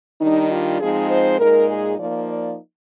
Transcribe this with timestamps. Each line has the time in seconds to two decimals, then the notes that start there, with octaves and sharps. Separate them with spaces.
0.20 D#3 G3 D4 D#4
0.50 F4
0.79 F3 G#3 C4 D#4 G#4
1.08 C5
1.38 A#2 G#3 D#4 A#4
1.68 G#4
1.97 F3 A#3 D#4 D5
2.27 D5